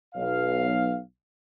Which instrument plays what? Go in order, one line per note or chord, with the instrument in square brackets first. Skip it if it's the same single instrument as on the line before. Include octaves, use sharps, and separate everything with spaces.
[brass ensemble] B1 F5